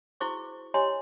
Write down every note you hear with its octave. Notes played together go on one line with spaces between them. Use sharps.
E4 F#4 G#4 C5 C#6 D6
G4 C#5 D#5 G#5 A#5 C6